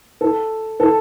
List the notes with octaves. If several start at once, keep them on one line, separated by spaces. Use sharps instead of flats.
A4
A4